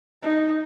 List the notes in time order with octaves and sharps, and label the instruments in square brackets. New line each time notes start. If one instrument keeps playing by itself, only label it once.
[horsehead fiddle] D#4